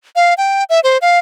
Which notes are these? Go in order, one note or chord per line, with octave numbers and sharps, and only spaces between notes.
F5
G5
E5
C5
F5